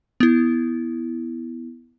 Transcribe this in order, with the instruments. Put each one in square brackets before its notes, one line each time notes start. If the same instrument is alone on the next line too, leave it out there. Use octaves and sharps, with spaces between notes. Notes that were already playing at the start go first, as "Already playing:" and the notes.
[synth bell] B3 E4